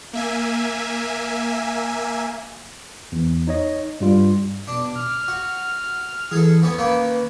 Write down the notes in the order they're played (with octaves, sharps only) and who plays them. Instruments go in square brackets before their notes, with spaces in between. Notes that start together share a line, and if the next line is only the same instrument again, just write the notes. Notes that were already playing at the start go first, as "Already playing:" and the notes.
[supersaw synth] A#3 E5 G#5
[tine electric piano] E2
D#4 C#5 D#5
G2 G3 F4
[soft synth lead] B2 [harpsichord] D4
[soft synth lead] F6
[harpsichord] F#4
[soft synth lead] E3 [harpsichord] G#4 A4
[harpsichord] E3 B3 C#4
[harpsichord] D#3 A#3 C#4 [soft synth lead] B4